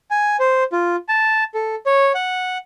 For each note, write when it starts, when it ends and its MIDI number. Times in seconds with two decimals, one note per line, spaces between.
0.11 0.37 80
0.40 0.64 72
0.72 0.96 65
1.09 1.44 81
1.54 1.75 69
1.86 2.12 73
2.15 2.58 78